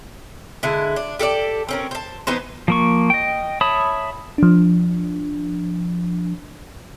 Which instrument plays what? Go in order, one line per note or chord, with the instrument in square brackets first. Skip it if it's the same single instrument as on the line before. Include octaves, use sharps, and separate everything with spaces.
[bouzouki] D3 G#3 E4
D4
G4 A4 A#4 D5
C4 C#4 A#4
C5 A5
E3 B3 D#4 C5
[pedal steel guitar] F3 A#3 C#6
D#5 G5
C#5 E5 A5 B5 D#6
[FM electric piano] F3 D4